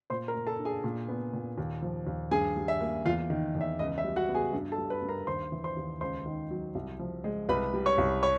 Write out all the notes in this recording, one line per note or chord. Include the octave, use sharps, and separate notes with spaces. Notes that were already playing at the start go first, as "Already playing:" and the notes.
A#2 C5 C6
A#4 A#5
A#3
A4 A5
D4
G#4 G#5
A#2
B3
A#2
D#2
F3
D#2
G2 G#4 G#5
G3
E5
A#3
E2 F4 F5
D#3
E2
E5
C#2 D#5
E5
G3
F#4 F#5
B3
G#4 G#5
G2
A4 A5
G3
B4 B5
G2
A#4 A#5
D#2 C5 C6
E3
C5 C6
D#2
C#2 C5 C6
D#3
F#3
C2
F3
G#3
C2 B4 B5
G3
C#5 C#6
C2
C#5 C#6